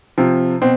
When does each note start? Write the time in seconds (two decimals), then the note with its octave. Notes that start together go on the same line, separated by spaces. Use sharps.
0.18 C3 F3
0.61 B2 C4